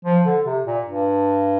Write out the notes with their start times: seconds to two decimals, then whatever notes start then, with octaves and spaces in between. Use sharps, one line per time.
0.05 F3
0.25 D3
0.45 C3
0.65 A#2
0.85 G2